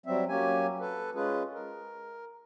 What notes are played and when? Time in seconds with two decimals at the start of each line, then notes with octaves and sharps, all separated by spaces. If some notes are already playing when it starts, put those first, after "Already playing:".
0.06 F#3 G3 C4 E5
0.29 F#3 A#3 C#4 G4 G#5
0.80 A4 B4
1.15 G#3 C#4 F4 G#4 B4
1.53 A#4